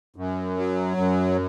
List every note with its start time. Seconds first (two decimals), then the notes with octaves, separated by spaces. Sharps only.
0.16 F#2
0.57 F#3
0.97 F#2